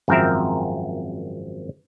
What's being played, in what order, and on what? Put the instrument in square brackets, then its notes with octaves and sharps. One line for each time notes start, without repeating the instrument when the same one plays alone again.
[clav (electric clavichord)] G#1 F#2 F3 C4 A#4 E5